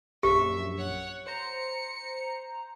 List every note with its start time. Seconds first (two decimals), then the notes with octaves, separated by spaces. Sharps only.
0.23 A#1 F#2 G4 E5
0.78 C#5 F#5
1.27 C5 A#5 C#7